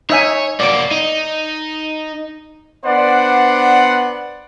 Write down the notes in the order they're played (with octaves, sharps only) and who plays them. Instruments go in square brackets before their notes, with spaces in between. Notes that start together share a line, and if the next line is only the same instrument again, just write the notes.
[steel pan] D#4 E5 G#5 [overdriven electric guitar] C#5
[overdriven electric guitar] A#3 F#4 [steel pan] D5 D6
[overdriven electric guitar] D#4
[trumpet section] B3 D4 C5 D5 F#5